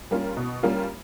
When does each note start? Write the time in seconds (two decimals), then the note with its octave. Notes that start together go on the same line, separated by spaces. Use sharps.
0.11 G3 A#3 C#4 F4
0.37 B2
0.63 G3 A#3 C#4 F4